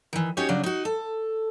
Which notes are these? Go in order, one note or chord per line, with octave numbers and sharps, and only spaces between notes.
D#3 E3
C#4 D#4 F#4 G4 C#5
C#3 F#3 D4
D#4 F#4
A4